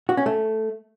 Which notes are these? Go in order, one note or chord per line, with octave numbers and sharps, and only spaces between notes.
F#4
C#4
A3